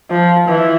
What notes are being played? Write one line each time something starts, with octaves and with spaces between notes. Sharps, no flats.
F3
E3